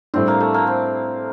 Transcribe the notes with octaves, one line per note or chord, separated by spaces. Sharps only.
A2 G3 C4 D4
A#3
A3
A#3
C4